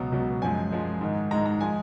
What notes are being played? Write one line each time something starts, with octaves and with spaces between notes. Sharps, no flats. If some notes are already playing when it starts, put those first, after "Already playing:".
Already playing: C#2 B2 F#3 A#5
C#2 B2 F#3
F#2 F3 G#3 G#5
F#2 F3 G#3
G#2 D#3 G#3
G#2 D#3 G#3 A#5
A#5
F3 G#3 G#5